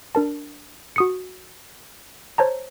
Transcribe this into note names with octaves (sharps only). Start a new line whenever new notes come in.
D4 A#4 A5
F#4 D#6 C#7
C5 C#5 A5 A#5